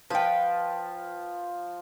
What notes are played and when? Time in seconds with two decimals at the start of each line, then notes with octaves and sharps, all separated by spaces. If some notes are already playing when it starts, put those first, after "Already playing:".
0.10 F3 F4 B4 G5